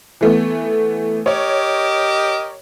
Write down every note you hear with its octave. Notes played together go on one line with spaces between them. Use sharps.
E3 A3 B3
G4 A#4 C#5 D#5